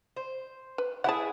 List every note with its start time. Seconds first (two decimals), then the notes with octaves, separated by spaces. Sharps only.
0.17 C5
0.78 B4
1.04 E4 G4 G#4 F#5 A5